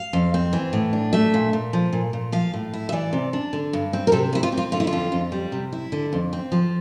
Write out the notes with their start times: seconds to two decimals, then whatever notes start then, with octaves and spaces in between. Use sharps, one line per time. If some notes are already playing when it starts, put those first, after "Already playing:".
Already playing: F5
0.13 F2
0.34 C4
0.53 E3
0.73 A2
0.93 D4
1.13 A3 E5
1.34 A#2
1.53 A#2
1.73 F3
1.93 A#2
2.13 A#2
2.32 F3 F5
2.54 A2
2.74 E4
2.89 E5
2.92 E3 D5
3.13 C3
3.33 D4
3.53 D3
3.73 G2
3.93 C4
4.07 A#4
4.12 C3 A4
4.33 F2 E4
4.43 F4
4.52 C4
4.57 F4
4.72 D3 F4
4.80 E4
4.87 F4
4.93 F2
5.12 F2
5.32 G3
5.52 C3
5.73 E4
5.92 D3
6.13 F2
6.33 C4
6.52 F3